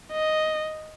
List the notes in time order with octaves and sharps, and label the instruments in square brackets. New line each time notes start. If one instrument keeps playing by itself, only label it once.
[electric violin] D#5